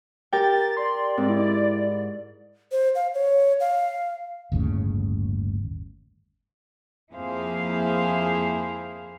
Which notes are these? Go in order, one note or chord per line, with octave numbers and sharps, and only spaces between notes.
G4 A#4 G5 A6
D5 C6
G#2 C4
E4
C5
F5
C#5
F5
G1 D#2 A2 C#3
F2 A#3 E4 G#4 C5 F5